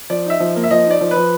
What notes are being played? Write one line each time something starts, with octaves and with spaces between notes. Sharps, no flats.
F3 D5
D#4 E5
F3
A#3
E5
F3 D#5
D#4 D5
F3
B4
F3